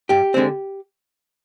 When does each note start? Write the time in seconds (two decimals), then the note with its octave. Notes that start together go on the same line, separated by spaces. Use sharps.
0.09 G2 G4
0.34 D3 G#3 C4